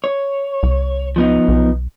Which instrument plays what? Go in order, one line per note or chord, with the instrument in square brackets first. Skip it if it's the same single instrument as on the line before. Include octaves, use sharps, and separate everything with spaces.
[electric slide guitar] C#5
[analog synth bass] C2
[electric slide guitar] F3 B3 D#4
[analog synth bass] B1